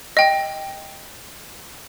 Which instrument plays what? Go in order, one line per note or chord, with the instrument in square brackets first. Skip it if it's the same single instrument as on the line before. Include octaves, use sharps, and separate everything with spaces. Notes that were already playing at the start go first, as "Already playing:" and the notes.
[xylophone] D#5 G5